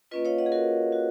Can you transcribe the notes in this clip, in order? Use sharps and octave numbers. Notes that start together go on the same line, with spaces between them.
A#3 C#4 F4 B4 D#5
C#5 F5
D#5 F#5
G#4
F#4 A#4
F#4